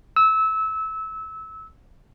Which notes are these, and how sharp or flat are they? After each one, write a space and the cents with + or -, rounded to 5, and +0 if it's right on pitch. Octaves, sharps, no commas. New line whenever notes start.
E6 -25